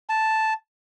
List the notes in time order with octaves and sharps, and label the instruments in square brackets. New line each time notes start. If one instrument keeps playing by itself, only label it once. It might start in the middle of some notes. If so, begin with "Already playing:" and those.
[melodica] A5